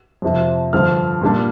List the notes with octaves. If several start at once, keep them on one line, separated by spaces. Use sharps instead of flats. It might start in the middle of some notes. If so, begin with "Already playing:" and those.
F2 C3 F3
G2 D3 F3 F6
A#2 G3 D4